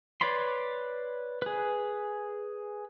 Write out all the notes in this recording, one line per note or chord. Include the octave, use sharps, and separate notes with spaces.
B4 C#5 D5 B5 C6
G#4 B4